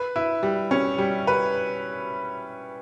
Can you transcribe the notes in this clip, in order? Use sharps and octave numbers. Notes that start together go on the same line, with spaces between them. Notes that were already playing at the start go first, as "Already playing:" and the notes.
Already playing: B4
E4
G3
C#4
G3
B4